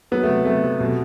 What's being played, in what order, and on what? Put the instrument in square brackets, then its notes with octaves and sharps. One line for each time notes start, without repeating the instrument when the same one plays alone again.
[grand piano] F#3 B3
A3
C3
C3 A3
C3
B2